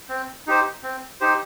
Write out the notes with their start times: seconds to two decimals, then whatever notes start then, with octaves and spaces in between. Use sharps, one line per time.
0.09 C4
0.47 D#4 G4 C5
0.83 C4
1.21 D#4 G4 C5